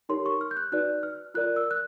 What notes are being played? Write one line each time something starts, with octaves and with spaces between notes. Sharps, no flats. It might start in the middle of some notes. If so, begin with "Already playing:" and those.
D#4 G4 A#4 C#5 C6
C#6
F6
G6
F#6
D#4 F#4 B4 D5 F#6
F6
F4 A#4 D5 F#6
E6
F#6